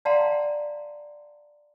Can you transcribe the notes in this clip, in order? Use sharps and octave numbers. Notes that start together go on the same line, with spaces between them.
D5 F5 F#5 A5 A#5 C6